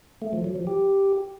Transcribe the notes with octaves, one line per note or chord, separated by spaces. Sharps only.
A3
F3
F#3
F3
G4